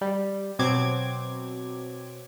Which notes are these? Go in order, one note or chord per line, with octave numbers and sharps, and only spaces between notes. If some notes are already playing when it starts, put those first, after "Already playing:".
G3
B2 F#3 C4 D6 G#6